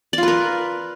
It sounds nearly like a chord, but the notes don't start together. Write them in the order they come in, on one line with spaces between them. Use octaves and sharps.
D5 F4 B4 A#4